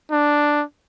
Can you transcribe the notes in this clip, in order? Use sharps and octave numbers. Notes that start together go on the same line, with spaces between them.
D4